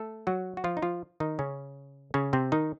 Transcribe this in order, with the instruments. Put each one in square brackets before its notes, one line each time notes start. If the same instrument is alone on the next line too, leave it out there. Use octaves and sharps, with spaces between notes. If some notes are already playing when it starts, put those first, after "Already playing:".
Already playing: [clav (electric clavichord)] A3 A4
F#3 F#4
F#4
F3 F4
D#4
F3 F4
D#3 D#4
C#3 C#4
C#3 C#4
C3 C4
D#3 D#4